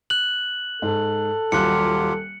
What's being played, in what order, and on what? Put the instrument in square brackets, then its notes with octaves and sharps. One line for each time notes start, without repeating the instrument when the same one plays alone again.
[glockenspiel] F#6 F#7
[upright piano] G#2 [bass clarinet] A4
[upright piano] D#1 F#6 [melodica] F#3 F4 G4 [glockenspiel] C#7